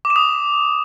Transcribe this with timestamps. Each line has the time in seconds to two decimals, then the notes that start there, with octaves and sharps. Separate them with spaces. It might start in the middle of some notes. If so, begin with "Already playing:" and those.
0.05 D6
0.10 E7
0.16 D#6